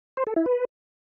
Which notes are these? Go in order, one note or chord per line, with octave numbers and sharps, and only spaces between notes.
C5
A4
E4
B4